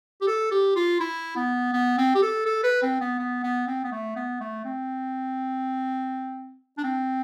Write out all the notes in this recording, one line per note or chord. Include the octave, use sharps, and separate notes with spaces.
G4
A4
G4
F4
E4
B3
B3
C4
G4
A4
A4
B4
C4
B3
B3
B3
C4
B3
A3
B3
A3
C4
D4
C4